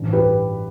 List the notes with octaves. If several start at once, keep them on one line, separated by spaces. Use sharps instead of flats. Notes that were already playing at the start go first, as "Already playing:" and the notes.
Already playing: A1 G2 E3
G4 B4